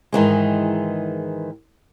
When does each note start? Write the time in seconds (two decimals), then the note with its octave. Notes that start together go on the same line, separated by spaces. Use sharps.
0.12 G#2 D#3 E3 G#3